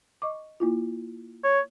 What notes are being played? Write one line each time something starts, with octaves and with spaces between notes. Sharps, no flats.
D#5 C#6 D6
A#3 E4 F4
C#5